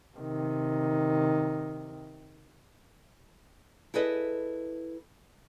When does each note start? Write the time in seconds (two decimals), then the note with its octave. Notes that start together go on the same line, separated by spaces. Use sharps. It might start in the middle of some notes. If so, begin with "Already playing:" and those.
0.17 C3 D#3
3.94 E4 G#4 A4 B4 D#5